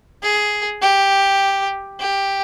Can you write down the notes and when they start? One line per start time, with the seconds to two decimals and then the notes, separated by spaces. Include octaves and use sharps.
0.23 G#4
0.82 G4
2.00 G4